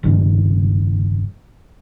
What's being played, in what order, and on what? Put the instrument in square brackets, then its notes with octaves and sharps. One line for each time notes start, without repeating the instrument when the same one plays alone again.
[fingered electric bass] F1 C#2 G2 D#3